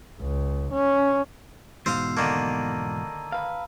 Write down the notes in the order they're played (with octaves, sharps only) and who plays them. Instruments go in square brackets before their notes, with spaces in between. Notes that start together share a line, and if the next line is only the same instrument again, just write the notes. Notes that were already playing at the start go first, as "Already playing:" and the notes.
[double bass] C#2
C#4
[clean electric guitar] E2 G#2 B2 [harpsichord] C5 F5 D#6 [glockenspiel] E6
[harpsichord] D3 D#3 A#3 [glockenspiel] A5 A#5 D#7
[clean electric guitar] B4 F5